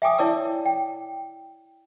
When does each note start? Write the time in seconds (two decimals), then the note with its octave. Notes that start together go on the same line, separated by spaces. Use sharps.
0.02 E5 G5 G#5 D6 D#6
0.18 E4 C#5 D5 A5 D6 E6
0.65 G5